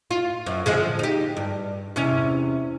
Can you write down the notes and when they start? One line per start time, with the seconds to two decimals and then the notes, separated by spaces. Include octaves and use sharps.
0.11 F4
0.46 F#2
0.66 D3 F3 G#3
0.99 D#4 G4
1.37 G2
1.96 E2 C3 C#4